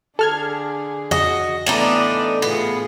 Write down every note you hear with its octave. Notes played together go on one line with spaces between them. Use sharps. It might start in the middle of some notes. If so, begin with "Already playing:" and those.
D3 G#4 A4 F6 G#6
F2 C#3 F#4 D#5
A2 E3 B3 D4 D#4 D5
A2 B3 F4 G#4